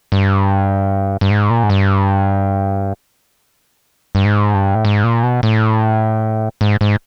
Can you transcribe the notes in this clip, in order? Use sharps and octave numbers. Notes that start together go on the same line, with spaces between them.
G2
G2
G#2
A#2
G#2
G2
G2
G#2
G2
A2
G#2
A#2
B2
A2
G#2
G#2